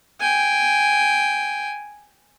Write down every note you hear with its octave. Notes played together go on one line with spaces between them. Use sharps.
G5 G#5